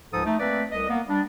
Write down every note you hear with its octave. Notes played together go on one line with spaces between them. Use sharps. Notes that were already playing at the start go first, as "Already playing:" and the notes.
C#2 G#2 F3 A4 D#6
A3 D#4
A3 A#3 C4 B4 D5
C2 D#5
A#3 B3
G3 D4